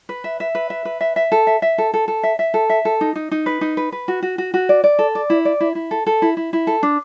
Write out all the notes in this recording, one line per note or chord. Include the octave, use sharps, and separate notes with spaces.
B4
E5
E5
B4
E5
B4
E5
E5
A4
E5
E5
A4
A4
A4
E5
E5
A4
E5
A4
D#4
D#4
D#4
B4
D#4
B4
B4
F#4
F#4
F#4
F#4
D5
D5
A4
D5
E4
D5
E4
E4
A4
A4
E4
E4
E4
A4
D4